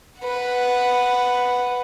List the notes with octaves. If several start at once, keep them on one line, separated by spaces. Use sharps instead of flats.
B4 F#5